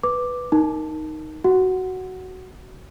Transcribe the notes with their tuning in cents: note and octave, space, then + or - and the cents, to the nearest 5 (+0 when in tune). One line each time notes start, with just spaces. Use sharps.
B4 +0 D6 +0
D#4 +0 A#4 +0 A5 +0
F#4 +10 F#5 +0